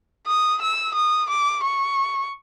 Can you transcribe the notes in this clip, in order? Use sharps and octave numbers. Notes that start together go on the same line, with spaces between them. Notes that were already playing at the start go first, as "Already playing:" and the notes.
D#6
E6
D#6
D6
C#6